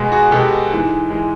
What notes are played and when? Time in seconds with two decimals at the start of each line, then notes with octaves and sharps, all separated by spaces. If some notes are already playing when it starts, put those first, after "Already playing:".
Already playing: B2 G#3
0.12 F#4 G#4
0.31 B2 G#3 G4 A4
0.71 G#2 E3 G#3
1.10 E3 G#3